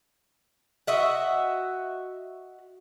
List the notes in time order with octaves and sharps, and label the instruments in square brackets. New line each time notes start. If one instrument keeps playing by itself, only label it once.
[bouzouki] F#4 D#5 E5 F#5